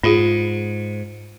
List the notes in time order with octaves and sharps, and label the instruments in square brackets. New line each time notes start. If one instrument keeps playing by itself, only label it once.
[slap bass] G#2 [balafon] F4 G#4